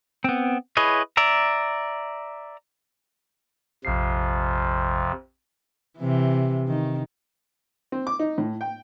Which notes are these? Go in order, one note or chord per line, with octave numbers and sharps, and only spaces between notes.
B3 C4
E4 G#4 B4 C#5 D#5
D5 E5 A#5
A#1 F2 C3 F3 C7
C3 E3
D#3
C4
D6
D#4
A2
G5